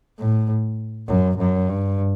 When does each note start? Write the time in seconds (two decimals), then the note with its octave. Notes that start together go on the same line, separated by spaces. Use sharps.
0.18 A2
1.08 F#2
1.38 F#2
1.68 G2